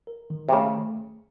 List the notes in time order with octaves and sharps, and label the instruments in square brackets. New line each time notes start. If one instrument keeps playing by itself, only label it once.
[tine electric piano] A#4
D#3
[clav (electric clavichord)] C3
[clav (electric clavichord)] C#3 [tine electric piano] A3